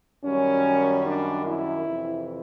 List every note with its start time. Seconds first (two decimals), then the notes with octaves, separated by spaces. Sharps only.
0.24 F#2 D#3 G3 C#4
1.06 D4
1.47 E4
1.87 F2 C3 E3